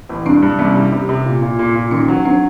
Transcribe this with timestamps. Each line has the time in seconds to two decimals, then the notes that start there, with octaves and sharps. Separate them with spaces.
0.09 A1
0.26 G2 C4 D4
0.42 G2
0.59 C2 B3 C#4
0.76 G3
0.92 C3
1.09 C3
1.26 A#2
1.42 A#2
1.59 A#2
1.76 A#2
1.91 D#3 C#4 D#4
2.08 F#3
2.25 F#3 C4 D4